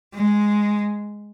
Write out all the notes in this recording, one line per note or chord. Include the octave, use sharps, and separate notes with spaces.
G#3